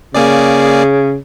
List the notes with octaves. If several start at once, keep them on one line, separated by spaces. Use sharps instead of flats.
C#3 A#3 G#4 D5